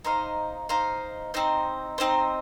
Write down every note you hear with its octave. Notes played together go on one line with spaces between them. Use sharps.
D#4 C5 F5
D#4 C5 F5
C4 D#4 C5
C4 D#4 C5